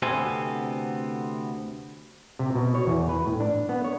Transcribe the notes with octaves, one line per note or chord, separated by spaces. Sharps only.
D2 C3 B3 C4 A4 G#5
C3
B2
C#5
E2
B4
A2
D4
B3
C#5